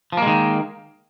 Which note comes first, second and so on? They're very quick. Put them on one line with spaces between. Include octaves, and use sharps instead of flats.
F3 A#3 G#3 D#3